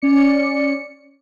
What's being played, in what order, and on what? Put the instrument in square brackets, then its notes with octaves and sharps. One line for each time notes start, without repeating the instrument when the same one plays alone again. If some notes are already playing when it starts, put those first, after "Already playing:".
[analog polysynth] C#4 D5 C#7